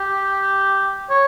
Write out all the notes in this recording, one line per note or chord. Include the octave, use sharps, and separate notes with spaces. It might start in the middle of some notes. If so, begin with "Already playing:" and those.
Already playing: G4
C#5